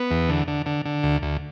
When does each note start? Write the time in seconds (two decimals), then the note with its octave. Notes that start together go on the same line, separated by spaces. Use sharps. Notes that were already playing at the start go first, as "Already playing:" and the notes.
Already playing: B3
0.11 E2
0.29 D3
0.48 D3
0.66 D3
0.85 D3
1.03 D2
1.22 D2